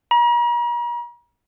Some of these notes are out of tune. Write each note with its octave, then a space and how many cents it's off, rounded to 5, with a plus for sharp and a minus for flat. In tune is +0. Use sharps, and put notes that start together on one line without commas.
A#5 +45